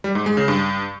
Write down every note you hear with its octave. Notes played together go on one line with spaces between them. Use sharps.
G3
G#2
G#3
C#3
G2